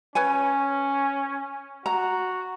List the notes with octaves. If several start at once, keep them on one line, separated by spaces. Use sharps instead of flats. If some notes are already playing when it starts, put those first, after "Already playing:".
C#4 B4 C#5 G#5
F#4 A#5